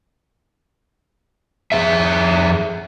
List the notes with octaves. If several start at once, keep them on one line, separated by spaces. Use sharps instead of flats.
F2 E3 G#4 E5